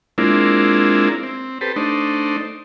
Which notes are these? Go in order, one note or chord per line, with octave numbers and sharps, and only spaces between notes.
G#3 A#3 C4 D4 E4 F4
C4
G4 A4 B4 C5
A3 D4 D#4 C5